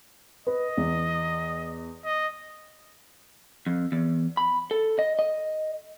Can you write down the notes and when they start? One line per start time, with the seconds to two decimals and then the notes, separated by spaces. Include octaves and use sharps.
0.47 B4 D#5
0.77 E2
2.05 D#5
3.66 F2
3.92 E2
4.37 B5
4.71 A4
4.99 D#5
5.19 D#5